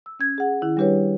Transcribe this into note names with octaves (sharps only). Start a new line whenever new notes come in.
E6
C#4 G#6
G#4 F#5
D#3 E4
G3 D4 G4 B4 C#5